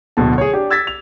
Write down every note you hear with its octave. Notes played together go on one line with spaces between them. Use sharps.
D1 B2 D3 A5
G#4 C#5
D4 G4
E6 G#6 A6 B6
F7